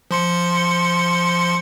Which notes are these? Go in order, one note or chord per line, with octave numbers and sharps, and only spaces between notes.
F3 C6 C#7